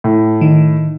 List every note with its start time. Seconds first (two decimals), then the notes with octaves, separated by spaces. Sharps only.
0.04 A2
0.41 D#3